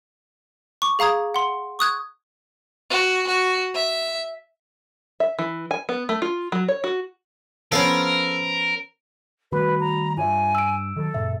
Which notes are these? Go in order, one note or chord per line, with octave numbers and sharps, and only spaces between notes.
C#6 D6
G#4 F5 A#5 D#6 G#6
F#5 C6
C#6 D#6 F#6 G#6
F#4
F#4
E5
E5
E3
G#5
B3
A3
F4
F#3
C#5
F#4
F3 B3 C#4 A4 A#4 F5
D#3 G3 A3 F#4 B4 B5
A#5
G2 F4 C#5 E5 G#5
E6 D7
D#3 F#3 A4
F#2 A#2 C#3 E5